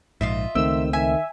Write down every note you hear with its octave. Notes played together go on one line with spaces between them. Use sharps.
A#1 G#2 F4 D#5 E5
C#2 D#3 A3 C4 E6
D#3 E5 G#5